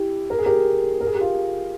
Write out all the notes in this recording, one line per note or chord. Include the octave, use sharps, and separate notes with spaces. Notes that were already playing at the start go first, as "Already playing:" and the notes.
Already playing: E4 G4
A#4
G#4
G4 A#4
A#4
G#4
G4
F4 G#4